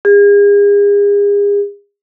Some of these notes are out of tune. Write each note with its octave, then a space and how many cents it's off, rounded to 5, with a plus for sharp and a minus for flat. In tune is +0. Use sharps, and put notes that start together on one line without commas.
G#4 -40